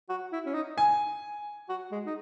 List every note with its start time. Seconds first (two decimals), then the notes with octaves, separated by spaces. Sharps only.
0.09 F#4
0.32 E4
0.46 C#4
0.54 D#4
0.78 G#5
1.69 F#4
1.92 G#3
2.06 D#4